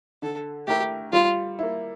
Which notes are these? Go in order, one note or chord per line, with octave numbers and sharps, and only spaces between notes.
D3 A4
A3 E4 G4 A#4
G3 F4
A#3 E4